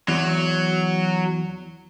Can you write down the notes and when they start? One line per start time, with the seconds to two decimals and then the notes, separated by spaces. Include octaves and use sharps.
0.08 E2 F#3